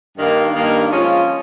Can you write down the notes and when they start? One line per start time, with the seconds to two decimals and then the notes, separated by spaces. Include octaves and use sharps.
0.17 G2 D#3 A#3
0.54 G2 D#3 A#3
0.91 F3 G#3 C#4 F4